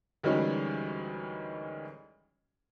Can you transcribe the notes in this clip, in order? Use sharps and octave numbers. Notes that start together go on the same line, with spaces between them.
D2 D#3 E3 G3 G#3 C#4